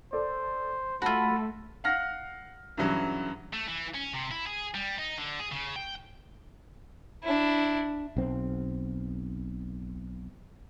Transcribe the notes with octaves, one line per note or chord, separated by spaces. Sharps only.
A4 C5 D5
A3 F4 F#4 A5 B5 E6
F5 F#5 F6 A#6
G2 C#3 E3 F#3
A3
E3
C#4
C3
E4
G#4
G3
D#4
D3
G#4
C#3
G5
D4 E4
B1 C4